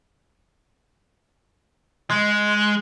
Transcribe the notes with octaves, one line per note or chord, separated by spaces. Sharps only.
G#3